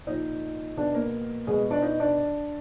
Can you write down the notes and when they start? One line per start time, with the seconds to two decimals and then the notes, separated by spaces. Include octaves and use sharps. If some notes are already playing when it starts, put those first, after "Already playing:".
0.07 A#2 F3 D#4 D#5
0.77 B2 D4 D5
0.94 A#3 A#4
1.47 B2 G#3 G#4
1.70 D4 D5
1.82 D#4 D#5
2.00 D4 D5